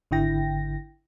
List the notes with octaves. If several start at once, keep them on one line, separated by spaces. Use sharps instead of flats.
G#1 D3 E4 G5 A#6